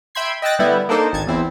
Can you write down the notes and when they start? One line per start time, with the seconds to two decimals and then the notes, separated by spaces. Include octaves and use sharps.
0.15 E5 G5 B5 C6 G#6 C7
0.42 D#5 G5 E6 F#6 A6 A#6
0.59 D3 G3 B3 E4
0.89 A#3 D4 D#4 A4 C5
1.13 G#1 A5 G#6
1.27 E2 C4 E4